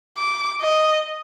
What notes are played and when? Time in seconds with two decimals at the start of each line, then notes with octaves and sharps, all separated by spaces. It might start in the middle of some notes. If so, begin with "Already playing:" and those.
0.17 D6
0.61 D#5